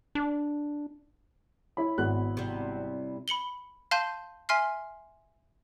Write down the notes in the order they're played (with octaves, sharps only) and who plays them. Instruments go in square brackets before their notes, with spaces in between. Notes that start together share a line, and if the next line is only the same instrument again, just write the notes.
[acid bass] D4
[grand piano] E4 C#5 B5
[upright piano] G#1 B3 F#6
[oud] C3 G3
[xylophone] B5 C#7 F#7 G7
F5 A5 C6 G6 D#7
E5 G#5 C6 F6 C7